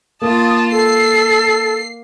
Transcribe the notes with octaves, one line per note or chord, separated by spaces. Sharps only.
A#3 F4 A5 D#6
A4 C7